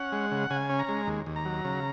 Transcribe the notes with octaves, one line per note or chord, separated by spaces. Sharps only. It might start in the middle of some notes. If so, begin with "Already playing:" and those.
Already playing: C#4 F#5
G#3
C#3
C#3 G#5
C#4
A#5
G#3
D#2
D#2
A#5
F#3
C#3